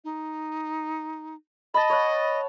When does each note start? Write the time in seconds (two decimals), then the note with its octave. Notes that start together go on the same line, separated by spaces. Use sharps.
0.04 D#4
1.74 D#5 A5 B5
1.90 C#5 F#5